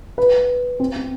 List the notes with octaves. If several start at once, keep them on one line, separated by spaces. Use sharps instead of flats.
B4
C4
C4